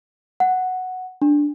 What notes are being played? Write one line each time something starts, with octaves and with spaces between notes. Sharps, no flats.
F#5
D4